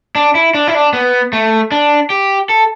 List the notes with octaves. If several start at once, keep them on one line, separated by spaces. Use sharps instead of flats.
D4
E4
D4
E4
D4
B3
A3
D4
G4
A4